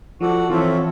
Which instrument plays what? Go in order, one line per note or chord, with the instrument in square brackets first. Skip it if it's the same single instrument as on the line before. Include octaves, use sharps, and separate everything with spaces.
[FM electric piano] F3 [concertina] F#4 A4 D5 F#5
[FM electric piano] E3 [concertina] C4 F4 A4 C#5 E5